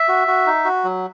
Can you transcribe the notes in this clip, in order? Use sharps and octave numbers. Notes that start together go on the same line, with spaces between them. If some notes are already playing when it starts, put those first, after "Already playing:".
Already playing: E5
F#4
F#4
D#4
F#4
F#3